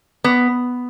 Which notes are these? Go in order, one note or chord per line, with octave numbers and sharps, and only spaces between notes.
B3